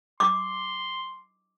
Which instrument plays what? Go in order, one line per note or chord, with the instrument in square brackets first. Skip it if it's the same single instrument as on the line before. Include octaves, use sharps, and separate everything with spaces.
[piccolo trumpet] C6 [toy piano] D6